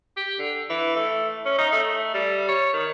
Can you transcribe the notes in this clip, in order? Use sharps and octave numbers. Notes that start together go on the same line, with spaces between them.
G4
D3
E3
A3
C#4
D#4
A3
G3
C#5
D#3